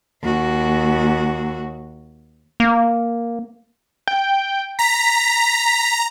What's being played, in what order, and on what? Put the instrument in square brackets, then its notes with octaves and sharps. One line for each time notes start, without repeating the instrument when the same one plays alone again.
[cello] D#2 F#4
[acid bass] A#3
[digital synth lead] G5
[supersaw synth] A#5 [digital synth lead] B6